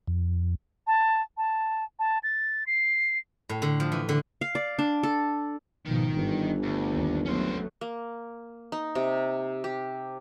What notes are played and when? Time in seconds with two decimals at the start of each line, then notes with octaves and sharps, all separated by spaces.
0.08 F2
0.87 A5
1.37 A5
1.99 A5
2.23 A6
2.67 C7
3.49 A2
3.62 D3
3.80 F3
3.92 E3
4.09 D3
4.41 F5
4.55 D5
4.79 D4
5.03 A4
5.86 G#1 B2 D#3 F3
6.16 G1 G2 E3
6.63 D2
6.93 D#2
7.26 F#3 A3 B3 C#4 C5
7.81 A#3
8.72 D#4
8.95 C3
9.64 G4